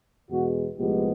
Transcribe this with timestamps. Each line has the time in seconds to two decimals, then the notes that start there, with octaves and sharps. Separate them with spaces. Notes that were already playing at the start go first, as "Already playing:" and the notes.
0.30 E2 B2 G#3 F#4
0.76 C2 A#2 F3 G#3 B3 G4